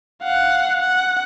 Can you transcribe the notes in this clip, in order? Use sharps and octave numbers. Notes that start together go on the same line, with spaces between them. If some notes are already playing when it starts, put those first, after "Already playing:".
F5 F#5
F#5